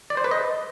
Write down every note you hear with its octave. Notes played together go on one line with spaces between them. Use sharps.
D5
C5
B4
D#5